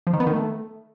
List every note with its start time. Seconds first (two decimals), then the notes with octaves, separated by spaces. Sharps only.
0.07 F3
0.13 D#3
0.20 B3
0.27 D#3
0.33 A3